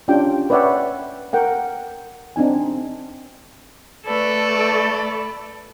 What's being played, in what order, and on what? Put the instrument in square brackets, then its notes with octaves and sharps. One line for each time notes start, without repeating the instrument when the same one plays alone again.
[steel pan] C#4 D4 F4 G4 G5
B4 C#5 D5 E5 F#5 G5
A#4 F#5 G5
C4 D4 D#4 G#5
[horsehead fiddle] A3 D5 [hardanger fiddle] A4 B4